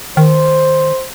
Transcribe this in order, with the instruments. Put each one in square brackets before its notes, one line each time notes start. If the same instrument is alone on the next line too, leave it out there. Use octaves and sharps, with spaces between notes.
[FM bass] D#3 [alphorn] C5